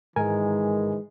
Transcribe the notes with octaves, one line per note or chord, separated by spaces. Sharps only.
G#2 D#3 E3 G#3 A#4 G#5